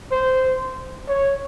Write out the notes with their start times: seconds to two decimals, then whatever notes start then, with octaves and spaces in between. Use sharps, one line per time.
0.11 C5
1.09 C#5